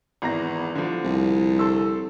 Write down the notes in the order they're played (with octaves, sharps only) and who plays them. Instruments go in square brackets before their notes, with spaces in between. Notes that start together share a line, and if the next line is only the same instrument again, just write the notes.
[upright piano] G#1 A#5 A#6 [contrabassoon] E2
[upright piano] D3 F3
[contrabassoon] C2
[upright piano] A4 C6 E6